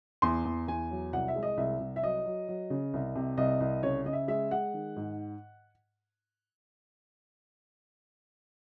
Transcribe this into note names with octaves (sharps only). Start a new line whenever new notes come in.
E2 C6
E2
E2 G#5
F#3
C2 F#5
E5
G#3
D#5
C2 E5
C2
E5
F#3 D#5
F#3
F#3
C#3
C2
C3
C2 D#5
C2
C#3 C#5
C#3 D#5
E5
G#3 E5
G#3 F#5
D#3
G#2